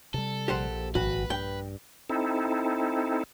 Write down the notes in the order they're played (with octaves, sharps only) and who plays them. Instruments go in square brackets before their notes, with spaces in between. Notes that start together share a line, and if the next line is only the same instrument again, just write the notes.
[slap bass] C3 G3 [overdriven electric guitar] A4
[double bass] A#1 [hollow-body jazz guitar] G4 C5 F#5
[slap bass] G#1 [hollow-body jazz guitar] F#4 [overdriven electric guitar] B4
[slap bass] G2 [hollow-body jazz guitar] G5
[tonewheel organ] C4 D#4 E4 A4